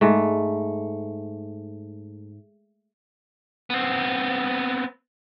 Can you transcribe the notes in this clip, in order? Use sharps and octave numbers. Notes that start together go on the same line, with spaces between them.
G#2 A3
B3 C4